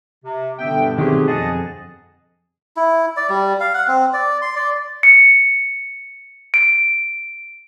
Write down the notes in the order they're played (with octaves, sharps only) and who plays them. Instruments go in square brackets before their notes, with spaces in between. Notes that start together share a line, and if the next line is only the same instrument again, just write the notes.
[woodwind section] C3
[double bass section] G2 B2 D3 [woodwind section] B3 E5 G5
[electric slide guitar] D#3 F#3 C4 [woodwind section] A3 G4 G#4
[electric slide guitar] F2 G#4 [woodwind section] D#5 F#5 A5
[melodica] E4
D5
G3
F5
F#5
C4
D5
C6
D5
[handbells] C#7
D7